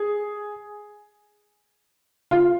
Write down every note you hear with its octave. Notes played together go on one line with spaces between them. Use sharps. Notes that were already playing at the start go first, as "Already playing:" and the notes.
Already playing: G#4
F4